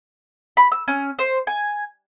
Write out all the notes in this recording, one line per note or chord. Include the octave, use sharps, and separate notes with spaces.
B5
E6
C#4
C5
G#5